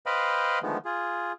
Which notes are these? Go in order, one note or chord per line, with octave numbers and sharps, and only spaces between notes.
B4 C5 D#5 F5 G5 B5
D3 D#3 F3 G#3 A3 B3
F4 G#4